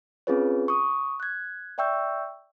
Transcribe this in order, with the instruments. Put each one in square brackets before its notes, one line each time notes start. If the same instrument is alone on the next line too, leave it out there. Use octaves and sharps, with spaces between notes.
[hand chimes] C4 C#4 F4 G#4 B4 C#5
C#6 D#6
F#6 G#6
D5 E5 G5 C#6 E6 G6